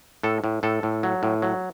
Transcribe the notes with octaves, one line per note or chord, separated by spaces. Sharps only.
A2 A4
A2
A2 A4
A2
F#3
A2
F#3